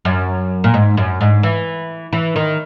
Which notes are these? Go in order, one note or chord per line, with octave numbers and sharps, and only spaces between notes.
F#2
A#2
G#2
F#2
G#2
E3
E3
D#3